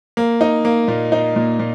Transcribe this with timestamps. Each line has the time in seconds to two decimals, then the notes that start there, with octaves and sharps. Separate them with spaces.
0.17 A#3
0.41 D#4
0.65 A#3
0.88 A#2
1.12 D#4
1.36 A#2
1.59 A#2